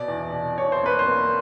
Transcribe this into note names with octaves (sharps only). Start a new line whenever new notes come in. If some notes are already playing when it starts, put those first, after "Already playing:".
Already playing: B2 D5
E2
B2
E2 C#5
C5
A#3 B4
C5
A#3